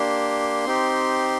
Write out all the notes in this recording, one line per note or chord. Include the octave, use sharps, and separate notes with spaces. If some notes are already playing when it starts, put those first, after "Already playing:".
Already playing: A#3 D4 G4 C6
C4 D#4 G4